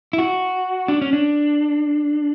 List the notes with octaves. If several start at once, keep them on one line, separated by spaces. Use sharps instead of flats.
E4
F#4
D4
C#4
D4